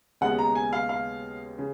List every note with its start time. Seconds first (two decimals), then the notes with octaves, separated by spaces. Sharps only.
0.21 D#2 C#3 G#3 B3 F#5
0.38 A#5
0.55 G#5
0.73 F5
0.89 F5
1.58 C#3